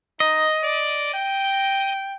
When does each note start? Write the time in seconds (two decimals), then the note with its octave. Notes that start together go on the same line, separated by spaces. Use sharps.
0.20 D#4 D#5
0.63 D5
1.14 G5